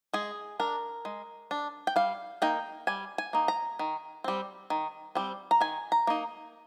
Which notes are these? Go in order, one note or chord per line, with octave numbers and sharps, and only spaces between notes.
G#3 G#4
D4 A#4
G#3
D4
G5
G3 F5
A#3 D#4 G5
G3 G#5
G#5
A#3 D#4
A#5
D#3
G3 C4
D#3
G3 C4
A#5
D#3 G#5
A#5
A#3 D#4